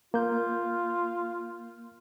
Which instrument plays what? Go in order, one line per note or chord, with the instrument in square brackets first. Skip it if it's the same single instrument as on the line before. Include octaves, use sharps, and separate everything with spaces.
[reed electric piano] A#3 G6 [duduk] F4